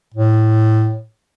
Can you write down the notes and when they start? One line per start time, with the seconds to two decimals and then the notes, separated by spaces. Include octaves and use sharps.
0.14 A2